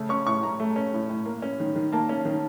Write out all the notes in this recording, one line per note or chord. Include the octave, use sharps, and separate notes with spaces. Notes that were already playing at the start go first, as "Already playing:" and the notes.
Already playing: C#3 A3
C#4 C#6
A2 C#6
A2 A#5
A3
C#4
A2
A2
A#3
C#4
D#3
D#3
A#3 A5
C#4
D#3